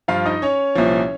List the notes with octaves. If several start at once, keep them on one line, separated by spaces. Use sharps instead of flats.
G2 F3 F4 F5
D#4 D#5
C#4 C#5
C2 A#2 F3